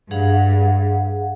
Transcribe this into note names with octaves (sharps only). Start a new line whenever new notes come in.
G2 G#4 F5 F#5